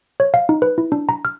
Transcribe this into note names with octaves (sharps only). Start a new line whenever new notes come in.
C#5
F5
D#4
B4
E4
D4
A#5
F6